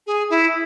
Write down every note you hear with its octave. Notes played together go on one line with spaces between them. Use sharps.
G#4
E4